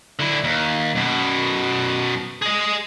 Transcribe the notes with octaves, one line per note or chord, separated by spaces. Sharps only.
D3 E4
D#2
F#2 B2
G#4 D#5